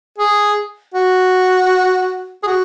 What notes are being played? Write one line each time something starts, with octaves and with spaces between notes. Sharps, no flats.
G#4
F#4
G#4
F#4